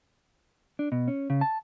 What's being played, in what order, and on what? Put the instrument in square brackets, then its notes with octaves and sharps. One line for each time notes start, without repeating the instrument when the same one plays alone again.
[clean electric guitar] D4
B2
C#4
C#3
A5